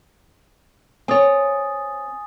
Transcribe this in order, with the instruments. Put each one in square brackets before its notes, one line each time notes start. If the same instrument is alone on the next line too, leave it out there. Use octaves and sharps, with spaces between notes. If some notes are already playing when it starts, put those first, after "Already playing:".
[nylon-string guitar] C4 C#5 [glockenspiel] G#5 D#6 A6